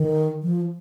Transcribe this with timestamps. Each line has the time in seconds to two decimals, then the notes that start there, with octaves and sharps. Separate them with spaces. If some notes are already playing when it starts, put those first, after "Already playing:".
Already playing: D#3
0.43 F3